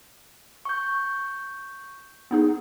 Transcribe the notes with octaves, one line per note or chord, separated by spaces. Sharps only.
C#6 G6
B3 D#4 G#4